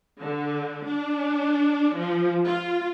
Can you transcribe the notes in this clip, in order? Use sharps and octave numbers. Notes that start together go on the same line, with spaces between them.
D3
D4
F3
F4